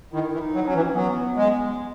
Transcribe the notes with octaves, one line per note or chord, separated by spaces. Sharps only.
D#3 E4
E3
D#4
F#3
F#3 C#4
E3
C#4
F#3 B3
G#3